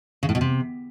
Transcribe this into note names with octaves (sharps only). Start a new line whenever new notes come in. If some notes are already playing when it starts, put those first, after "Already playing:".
C#3
A2
B2
C3